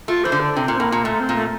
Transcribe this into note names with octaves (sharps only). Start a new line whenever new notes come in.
A3 F4
E3 C5
D3
D4
C3 C4
A#2
C4
A2 A#3
A#2
A#2 A3
C4
A#2
A3